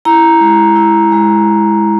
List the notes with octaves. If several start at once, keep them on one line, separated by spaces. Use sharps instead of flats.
E4 A#5
G#3
E4
G#3